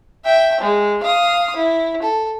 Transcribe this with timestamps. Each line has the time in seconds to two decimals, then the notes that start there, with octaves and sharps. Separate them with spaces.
0.24 E5 G5
0.60 G#3
1.03 F5 D#6
1.56 E4
2.02 A4